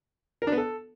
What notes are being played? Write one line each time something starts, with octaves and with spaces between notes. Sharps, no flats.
A#4
D4
B3
A4